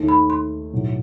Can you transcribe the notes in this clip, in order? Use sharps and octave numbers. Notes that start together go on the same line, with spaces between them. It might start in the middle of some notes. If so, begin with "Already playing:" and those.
Already playing: D#2 D#3 A3
B5
C6
B1 A2 F#3